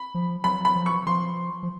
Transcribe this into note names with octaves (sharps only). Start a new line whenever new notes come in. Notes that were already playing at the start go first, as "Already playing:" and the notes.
Already playing: B5
F3
F#3 B5
B5
F3
C#6
F3 C6
F3